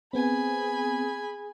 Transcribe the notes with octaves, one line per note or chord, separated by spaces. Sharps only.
B3 C4 G#4 G#5 B5